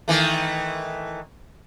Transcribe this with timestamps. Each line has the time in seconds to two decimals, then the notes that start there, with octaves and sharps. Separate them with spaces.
0.08 D#3 E3 A3